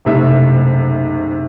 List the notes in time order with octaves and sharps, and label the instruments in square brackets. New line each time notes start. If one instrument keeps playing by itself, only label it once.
[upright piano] F#1 B1 C3 A3 E5